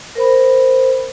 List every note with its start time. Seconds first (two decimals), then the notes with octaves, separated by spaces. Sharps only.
0.15 A#4 C5 B5